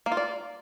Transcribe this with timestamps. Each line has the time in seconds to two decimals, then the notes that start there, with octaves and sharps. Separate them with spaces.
0.06 A#3
0.12 F4
0.17 D5